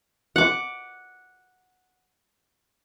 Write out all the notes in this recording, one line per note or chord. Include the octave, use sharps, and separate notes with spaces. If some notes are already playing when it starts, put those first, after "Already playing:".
F#5 D6